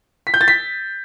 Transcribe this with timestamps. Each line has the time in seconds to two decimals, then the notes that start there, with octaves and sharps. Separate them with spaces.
0.27 B6
0.34 G6
0.41 A6
0.48 B6